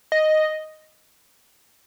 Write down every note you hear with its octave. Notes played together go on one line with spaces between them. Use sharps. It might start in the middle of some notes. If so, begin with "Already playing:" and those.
D#5